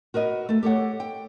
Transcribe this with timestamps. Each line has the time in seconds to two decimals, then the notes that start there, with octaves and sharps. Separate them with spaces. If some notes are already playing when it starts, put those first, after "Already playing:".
0.14 F#4 A#4 B4 D#5
0.49 A3 A4
0.63 G4 A4 C#5 F#5
1.00 G5